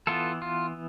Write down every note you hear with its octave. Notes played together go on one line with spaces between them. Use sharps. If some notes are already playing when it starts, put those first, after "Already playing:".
E3 B3 F4 A4
F4